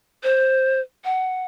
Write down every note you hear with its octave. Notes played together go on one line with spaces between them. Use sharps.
C5
F#5